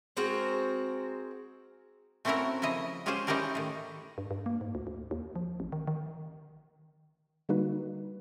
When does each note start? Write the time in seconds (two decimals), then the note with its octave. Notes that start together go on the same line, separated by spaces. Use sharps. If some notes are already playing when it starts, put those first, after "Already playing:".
0.17 G#3 C4 F#4 A#4
2.25 A3 C4 C#4 E4 F#4 A#4
2.62 C#3 F3 E4 D#5
3.06 G#3 C#4 F4 G4 G#4 C5
3.27 C#4 D#4 E4 G4 A#4 D5
3.55 A2 D#3
4.18 G2
4.31 G2
4.46 A#3
4.61 G#2
4.75 D2
4.87 D2
5.11 D#2
5.36 F3
5.60 A1
5.72 D#3
5.88 D#3
7.49 D3 G3 A#3 D#4 F#4 B4